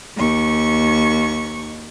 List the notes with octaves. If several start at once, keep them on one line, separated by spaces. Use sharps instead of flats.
D#2 C#6